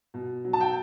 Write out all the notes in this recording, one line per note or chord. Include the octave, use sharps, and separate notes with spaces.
B2
F#3
A5
G5